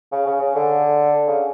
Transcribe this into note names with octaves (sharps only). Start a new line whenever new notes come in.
C#3
C#3
C#3
D3
C#3